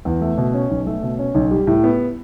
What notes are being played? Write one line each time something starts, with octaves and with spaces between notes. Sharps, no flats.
E2
A3
B2
C#4
B1
A3
B2
C#4
B1
G3
A2
B3